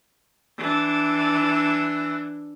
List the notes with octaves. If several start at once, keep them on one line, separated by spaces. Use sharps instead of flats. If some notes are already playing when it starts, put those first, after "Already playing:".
E3 D4